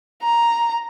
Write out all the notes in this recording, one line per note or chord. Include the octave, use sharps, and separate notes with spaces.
A#5